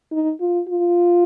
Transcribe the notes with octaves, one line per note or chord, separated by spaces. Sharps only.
D#4
F4
F4